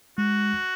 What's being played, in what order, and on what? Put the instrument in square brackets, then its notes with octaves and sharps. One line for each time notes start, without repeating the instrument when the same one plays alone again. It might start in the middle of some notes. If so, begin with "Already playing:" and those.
[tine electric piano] G#3 [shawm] F#4